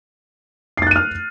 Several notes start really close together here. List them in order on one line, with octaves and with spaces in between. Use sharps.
C7 A6 F#6 D#7 F6